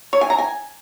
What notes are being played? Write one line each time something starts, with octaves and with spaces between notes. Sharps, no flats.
C#5
G#5
A#5
G#5